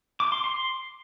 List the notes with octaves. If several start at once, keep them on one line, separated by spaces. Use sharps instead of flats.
D6
C6
C6